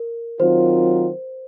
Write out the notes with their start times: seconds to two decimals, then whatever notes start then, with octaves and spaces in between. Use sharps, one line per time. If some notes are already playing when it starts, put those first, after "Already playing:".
Already playing: A#4
0.40 D#3 F#3 C4 F4 C5